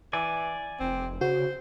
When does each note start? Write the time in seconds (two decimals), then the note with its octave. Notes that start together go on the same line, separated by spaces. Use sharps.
0.13 E3 D5 G#5
0.80 F1 C4
1.21 C#3 F#4 C5